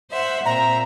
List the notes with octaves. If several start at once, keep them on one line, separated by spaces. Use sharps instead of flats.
C5 E5 F#5
A#2 C4 E5 A#5